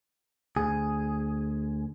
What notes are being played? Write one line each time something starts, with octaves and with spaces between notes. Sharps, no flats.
D2 G#4